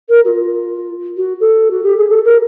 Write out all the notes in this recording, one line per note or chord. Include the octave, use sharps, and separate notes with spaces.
A#4
F#4
F4
F#4
A4
F#4
G4
G#4
A4
A#4